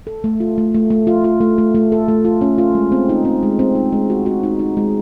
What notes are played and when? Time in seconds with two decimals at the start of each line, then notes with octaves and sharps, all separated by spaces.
0.07 A4
0.24 A3
0.40 F4
0.58 A3
0.74 A3
0.90 A3
1.07 F4
1.24 F4
1.41 A3
1.58 A3
1.75 A3
1.92 A4
2.08 A3
2.25 F4
2.41 C#4
2.58 F4
2.75 G#3
2.92 C4
3.09 D#4
3.25 C4
3.43 G#3
3.59 C4
3.75 D#4
3.93 G#3
4.10 F#4
4.26 F#4
4.43 D#4
4.59 D#4
4.77 G#3